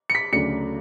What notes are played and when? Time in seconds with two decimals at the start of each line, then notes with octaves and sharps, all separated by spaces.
0.10 C#7
0.15 B6
0.33 D2 C#3 F#3 A3 D4 C#7